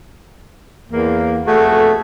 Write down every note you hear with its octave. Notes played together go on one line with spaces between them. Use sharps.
E2 A#3
F2 B2 A3 F#4 G#4 A4